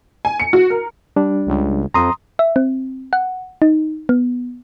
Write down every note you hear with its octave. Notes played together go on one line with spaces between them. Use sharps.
G#5
C#7
F#4
A#4
G3 D4
C#2
F2 A#5 C6 D#6
E5
C4
F#5
D#4
B3